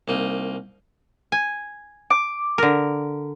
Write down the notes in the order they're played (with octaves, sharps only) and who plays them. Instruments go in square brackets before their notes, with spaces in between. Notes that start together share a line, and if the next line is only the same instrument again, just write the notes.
[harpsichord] C2 A#3 D#4
[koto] G#5
[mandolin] D6
[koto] D3 A#4